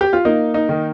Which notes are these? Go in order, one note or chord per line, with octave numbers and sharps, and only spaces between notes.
G4
F4
A#3 D#4
D#4
D#3